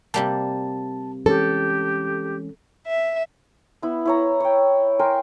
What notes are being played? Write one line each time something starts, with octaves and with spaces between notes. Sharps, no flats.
C3 G3 A#3 A5
E3 G#3 C#4 G4 A4
E5
B3 E4
E4 C#5 A#5
C#5 G5
A#4 C5 G5 G#5